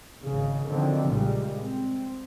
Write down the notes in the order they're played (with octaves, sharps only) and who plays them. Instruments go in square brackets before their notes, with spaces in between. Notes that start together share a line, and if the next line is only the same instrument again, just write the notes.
[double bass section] G#1 C#3
D3 D#3 F3 F#3 C4
A#1 A#2 C#3 G3 G#3
C4